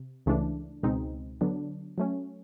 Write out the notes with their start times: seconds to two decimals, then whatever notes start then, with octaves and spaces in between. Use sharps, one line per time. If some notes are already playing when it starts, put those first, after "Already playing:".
Already playing: C3
0.26 C#2 C#3 E3 A3 D4
0.83 C#2 B2 G#3 C4 D#4
1.41 D3 F#3 B3 D4
1.98 F#3 A3 C#4